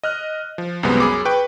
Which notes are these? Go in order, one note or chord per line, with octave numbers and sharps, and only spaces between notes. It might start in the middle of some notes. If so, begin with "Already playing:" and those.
D#5 F6 F#6
F3
C2 F#2 C3 G#3 B3
F#2 G#4 B5 D6
B4 G5 C#6